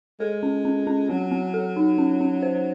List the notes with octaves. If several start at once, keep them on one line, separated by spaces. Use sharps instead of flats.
G#3 A4
C#4
C#4
C#4
F#3 C4
C4
A4
D#4
C#4
C#4
C5